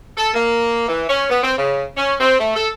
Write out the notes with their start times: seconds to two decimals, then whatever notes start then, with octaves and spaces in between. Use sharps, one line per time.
0.17 A4
0.34 A#3
0.88 E3
1.09 C#4
1.30 B3
1.43 C4
1.57 C#3
1.97 C#4
2.19 C4
2.39 A3
2.55 A4